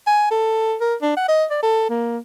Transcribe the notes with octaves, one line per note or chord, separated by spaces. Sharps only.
G#5
A4
A#4
D4
F#5
D#5
D5
A4
A#3